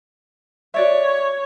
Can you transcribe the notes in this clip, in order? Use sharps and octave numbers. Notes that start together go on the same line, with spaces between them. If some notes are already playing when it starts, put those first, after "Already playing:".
F#4 C#5 D5 E5